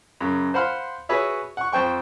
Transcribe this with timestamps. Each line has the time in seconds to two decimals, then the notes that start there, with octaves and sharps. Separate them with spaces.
0.21 F#2 C#3
0.54 C5 F5 F#5 B5 C6 F6
1.09 F#4 G#4 B4 C#5 E5
1.57 F#5 C#6
1.72 F2 C5 G5 C#6